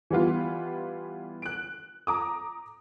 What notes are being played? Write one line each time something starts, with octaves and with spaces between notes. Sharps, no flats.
E3 G3 B3 F4
F#6 D7
A#5 D6 D#6